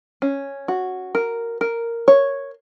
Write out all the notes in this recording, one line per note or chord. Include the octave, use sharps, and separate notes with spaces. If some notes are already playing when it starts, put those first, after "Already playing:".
C#4
F#4
A#4
A#4
C#5